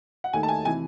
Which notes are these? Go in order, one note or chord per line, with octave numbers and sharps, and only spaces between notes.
F#5
D#2 D#3 A3 G#5
A5
G#5
C3 E3 G#5